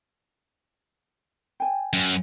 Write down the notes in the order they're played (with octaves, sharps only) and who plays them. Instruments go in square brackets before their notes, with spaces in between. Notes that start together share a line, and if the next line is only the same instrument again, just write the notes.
[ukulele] G5 G#5
[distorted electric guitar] F#2